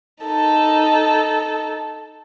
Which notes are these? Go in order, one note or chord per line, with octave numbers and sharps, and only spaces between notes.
D#4 A4